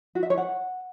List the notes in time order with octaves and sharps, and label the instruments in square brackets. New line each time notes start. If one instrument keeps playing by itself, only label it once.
[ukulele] F#4
E5
C#5
F#5